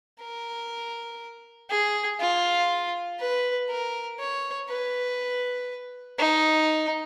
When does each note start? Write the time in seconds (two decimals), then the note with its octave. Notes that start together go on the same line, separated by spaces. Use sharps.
0.20 A#4
1.70 G#4
2.20 F4
3.19 B4
3.70 A#4
4.19 C#5
4.69 B4
6.19 D#4